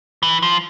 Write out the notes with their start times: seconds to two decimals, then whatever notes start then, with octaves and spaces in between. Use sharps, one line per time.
0.23 E3
0.42 F3